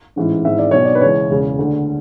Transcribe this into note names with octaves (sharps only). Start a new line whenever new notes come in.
A1 G#2 E3
G#1 G#2 E3 E5
D5
B1 B2 C#5
D5
B4
C#2 C#3 E3 C#5
E1 E2 C#3
D2 D3